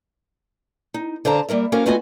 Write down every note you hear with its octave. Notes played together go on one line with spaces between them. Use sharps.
D#4
D3 C5 F5 A5 A#5
G3 A#3 A#4 E5
A#3 C#4 F#4 A#4 C5 F5
A3 B3 F4 F#4 D#5 G#5